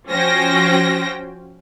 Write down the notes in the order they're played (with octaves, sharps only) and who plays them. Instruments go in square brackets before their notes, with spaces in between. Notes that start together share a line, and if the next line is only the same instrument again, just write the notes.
[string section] F3 C#4 F#4 C5 G5 A#6